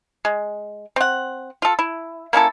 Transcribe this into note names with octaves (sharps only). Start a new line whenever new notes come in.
G#3
C4 F#5
F4 A4
E4
A#3 C#4 E4 A4